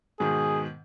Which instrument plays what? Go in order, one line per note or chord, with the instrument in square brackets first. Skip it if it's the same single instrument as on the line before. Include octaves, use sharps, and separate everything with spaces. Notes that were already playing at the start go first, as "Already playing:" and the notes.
[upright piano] G#2 B2 D#3 [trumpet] G#4